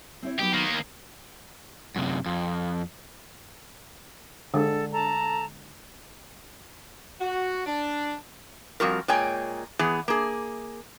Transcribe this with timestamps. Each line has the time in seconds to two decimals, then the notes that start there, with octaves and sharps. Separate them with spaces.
0.23 C4 E4 C#5
0.39 F#3 B3 D#4 G4
0.53 D#3 A#3
0.66 D#2
1.96 F#2 C3
2.26 F2
4.54 D3 G#3 A4
4.93 A4 A5 A#5
7.21 F#4
7.66 D4
8.80 F2 G3 F#4 A#4
9.08 A#2 G#3 C#5 G5 G#5
9.79 E3 B3 G#4
10.08 A#3 G#4